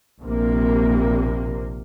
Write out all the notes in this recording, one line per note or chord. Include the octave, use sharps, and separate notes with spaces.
A#1 C3 A#3